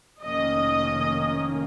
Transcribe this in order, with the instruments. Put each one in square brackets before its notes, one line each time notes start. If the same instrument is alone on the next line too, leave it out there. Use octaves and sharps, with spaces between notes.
[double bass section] F1 F2 D#3 A#3 C#4 [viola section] D#5